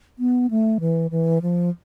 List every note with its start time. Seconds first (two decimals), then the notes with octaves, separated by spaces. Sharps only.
0.19 B3
0.51 A3
0.80 E3
1.11 E3
1.42 F3